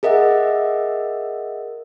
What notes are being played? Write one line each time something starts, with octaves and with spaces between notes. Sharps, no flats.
G#4 A#4 D#5 E5 F#5